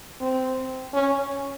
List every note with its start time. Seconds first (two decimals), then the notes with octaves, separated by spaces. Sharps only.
0.21 C4
0.93 C#4